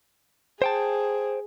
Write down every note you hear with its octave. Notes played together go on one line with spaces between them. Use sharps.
G#4 C5 G5 A5